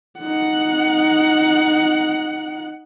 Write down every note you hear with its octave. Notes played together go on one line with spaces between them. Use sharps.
D#4 F#5